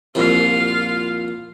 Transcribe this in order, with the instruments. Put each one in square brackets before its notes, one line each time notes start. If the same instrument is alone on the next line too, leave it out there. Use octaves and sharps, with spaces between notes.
[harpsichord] C2 F2 A#2 [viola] F4 F5